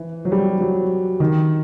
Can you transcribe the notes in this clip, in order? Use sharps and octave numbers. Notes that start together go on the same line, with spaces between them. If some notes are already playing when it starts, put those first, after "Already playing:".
Already playing: E3
F#3
G3
F#3
D#3